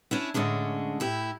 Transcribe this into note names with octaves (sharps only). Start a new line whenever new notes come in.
C#4 D4 E4
A2 D3 G#3 C#4 D4
A2 E4 G4